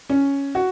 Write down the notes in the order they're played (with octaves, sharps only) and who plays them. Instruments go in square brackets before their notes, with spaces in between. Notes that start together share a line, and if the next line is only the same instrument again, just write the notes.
[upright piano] C#4
F#4